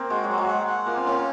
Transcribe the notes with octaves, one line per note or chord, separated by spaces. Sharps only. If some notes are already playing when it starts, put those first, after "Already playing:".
Already playing: A#3 C4
G#3 F#4
F#3
F#4
G#3
F#5
F#5
A#3 F4
C4
A#3 C#4